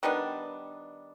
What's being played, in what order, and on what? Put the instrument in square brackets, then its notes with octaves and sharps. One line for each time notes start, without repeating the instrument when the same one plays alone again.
[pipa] D#3 G3 B3 D4